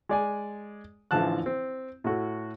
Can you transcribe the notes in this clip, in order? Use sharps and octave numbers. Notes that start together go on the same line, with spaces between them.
G#3 D5 G#5
A1 D3 E3 F3 A5 F#6
C4
A2 F#4 A4